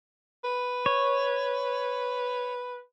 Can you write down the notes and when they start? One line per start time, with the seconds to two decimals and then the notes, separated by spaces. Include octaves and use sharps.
0.44 B4
0.86 C#5